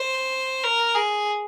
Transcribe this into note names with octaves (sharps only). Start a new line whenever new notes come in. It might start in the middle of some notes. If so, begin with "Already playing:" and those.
Already playing: C5
A#4
G#4